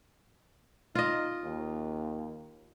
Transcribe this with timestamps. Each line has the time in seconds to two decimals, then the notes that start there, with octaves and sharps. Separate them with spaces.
0.95 D#4 F4 D#5
1.44 D#2